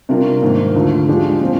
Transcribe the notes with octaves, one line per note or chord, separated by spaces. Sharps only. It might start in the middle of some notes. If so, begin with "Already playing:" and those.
C3 G3 D4 F4 A#4
G#2 D#3 A#3
D2 D3 F3
F3 G#3 D4 G4
A#2 F3 C4